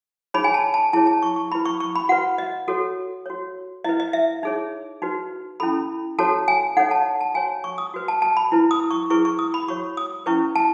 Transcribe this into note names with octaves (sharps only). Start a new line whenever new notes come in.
D#4 G#4 C#5 B5
G#5
A5
A5
E4 G#4 C#5 A5
A5
C#6
C#6
E4 B4 B5
C#6
C#6
B5
F#4 B4 F#5
D#5
F#4 A4 C#5
F#4 C#5
E4 B4 D#5
D#5
E5
D#4 G#4 C#5
D#4 F#4 B4
C#4 E4 A4 B5
F#4 A4 C#5 A5
G#5
D#4 A4 C#5 F#5
A5
A5
F#4 C#5 G#5
C#6
D#6
F#4 B4
A5
A5
B5
E4 B4
D#6
C#6
E4 G#4 B4 C#6
C#6
D#6
B5
F#4 C#5 C#6
D#6
C#4 E4 B4 C#6
A5